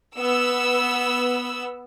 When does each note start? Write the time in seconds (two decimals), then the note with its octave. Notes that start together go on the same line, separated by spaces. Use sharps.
0.17 B3 E6